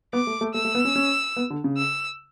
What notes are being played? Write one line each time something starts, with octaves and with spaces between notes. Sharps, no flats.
B3 D6
A3
A3
A3 E6
A3
B3
C#4
C#4
B3
D3
C#3
E6